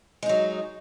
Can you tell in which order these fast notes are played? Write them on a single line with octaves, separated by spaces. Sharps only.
G#3 D#4 F#3